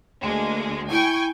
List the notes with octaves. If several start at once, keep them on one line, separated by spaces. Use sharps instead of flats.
D2 G#3 A#3
E4 G5 G#5 C#6